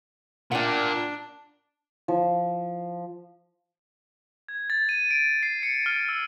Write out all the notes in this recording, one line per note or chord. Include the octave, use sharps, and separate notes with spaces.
A#2 D4 F#5 G5
F3
G#6
A6
D#7
D7
C7
C#7
F6
E6